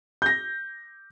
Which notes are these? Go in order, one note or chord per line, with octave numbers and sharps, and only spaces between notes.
G6 A#6